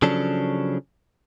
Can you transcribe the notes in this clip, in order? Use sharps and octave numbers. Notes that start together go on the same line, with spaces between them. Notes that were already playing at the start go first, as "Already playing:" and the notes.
C#3 F3 F#3 C#4 D4 A4